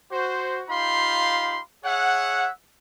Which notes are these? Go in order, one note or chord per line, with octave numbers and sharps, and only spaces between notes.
F#4 C5
D#4 F4 G4 F5 B5 C6
G#4 C#5 E5 F#5